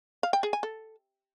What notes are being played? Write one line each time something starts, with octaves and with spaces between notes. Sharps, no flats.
F5
G5
G#4
G#5
A4